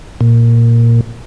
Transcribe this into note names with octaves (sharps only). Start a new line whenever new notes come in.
A#2